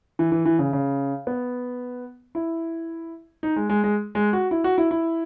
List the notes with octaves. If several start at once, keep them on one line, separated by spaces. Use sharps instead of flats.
E3
E3
E3
C#3
C#3
B3
E4
D#4
G#3
G#3
G#3
G#3
F#4
E4
F#4
E4
E4